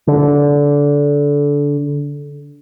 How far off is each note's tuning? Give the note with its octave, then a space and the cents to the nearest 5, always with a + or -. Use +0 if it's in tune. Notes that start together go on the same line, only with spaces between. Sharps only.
D3 -20